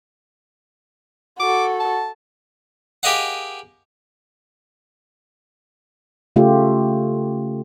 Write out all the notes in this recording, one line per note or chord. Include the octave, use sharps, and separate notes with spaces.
F#4 A4 D6
A5
G4 G#4 A#4 D#5 F5 F#5
C#3 A3 F4 G4